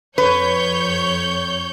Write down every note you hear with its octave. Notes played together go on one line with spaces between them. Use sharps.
F2 B4 C#5 G6